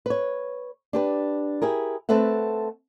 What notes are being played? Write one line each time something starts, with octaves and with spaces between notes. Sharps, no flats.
B4 C#5
D4 G4 B4
E4 G4 G#4 A#4
A3 C4 A4 B4 E5 F#5